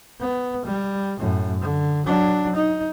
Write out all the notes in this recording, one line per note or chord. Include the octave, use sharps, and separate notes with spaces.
B3
G3
F#2 A2
D3
F#3 D4
D#4